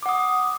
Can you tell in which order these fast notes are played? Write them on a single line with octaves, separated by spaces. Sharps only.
D6 F#5 D#6